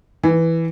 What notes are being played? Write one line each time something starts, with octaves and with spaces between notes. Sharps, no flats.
E3